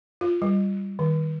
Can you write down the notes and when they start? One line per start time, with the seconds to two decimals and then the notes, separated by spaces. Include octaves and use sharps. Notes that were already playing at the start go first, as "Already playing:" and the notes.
0.21 F4
0.42 G3
0.99 D#3